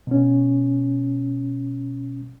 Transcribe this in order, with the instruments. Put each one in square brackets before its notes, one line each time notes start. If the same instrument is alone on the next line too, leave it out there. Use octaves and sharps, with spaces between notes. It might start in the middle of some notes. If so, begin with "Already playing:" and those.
[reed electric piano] B2 C#4